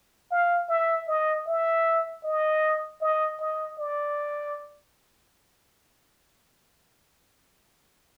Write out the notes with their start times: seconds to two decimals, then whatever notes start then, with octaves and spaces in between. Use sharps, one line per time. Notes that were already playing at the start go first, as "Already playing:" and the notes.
0.31 F5
0.69 E5
1.08 D#5
1.46 E5
2.24 D#5
3.01 D#5
3.40 D#5
3.79 D5